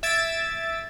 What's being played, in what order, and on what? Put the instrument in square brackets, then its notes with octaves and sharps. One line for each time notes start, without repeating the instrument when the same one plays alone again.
[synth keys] E5 E6 G#6 A6 D7 E7